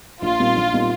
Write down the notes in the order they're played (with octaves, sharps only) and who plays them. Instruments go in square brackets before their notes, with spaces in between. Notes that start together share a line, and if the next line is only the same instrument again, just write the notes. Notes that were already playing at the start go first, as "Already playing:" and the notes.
[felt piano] A#1 [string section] F4
[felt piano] A#2 G3 C4 D#4
A#1
A#2 G3 C4 D#4